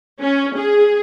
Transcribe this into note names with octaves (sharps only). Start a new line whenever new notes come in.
C#4
G#4